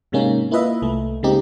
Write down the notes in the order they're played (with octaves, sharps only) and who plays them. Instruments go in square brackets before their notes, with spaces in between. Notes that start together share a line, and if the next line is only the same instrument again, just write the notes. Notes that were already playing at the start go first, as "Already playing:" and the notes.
[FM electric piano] G#2 C3 G#3 A#3 C#4 D#4
A#3 E4 F4 B4 D#5 E5
C2 A3
C#3 G#3 A#3 C4 D#4 G4